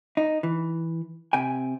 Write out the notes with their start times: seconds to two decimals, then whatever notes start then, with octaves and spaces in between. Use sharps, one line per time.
0.17 D#4
0.43 E3
1.33 C3 G5 G#5